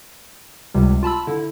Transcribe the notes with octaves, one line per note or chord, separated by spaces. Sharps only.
C#2 C3 G3
F4 A5 B5 E6
D3 E4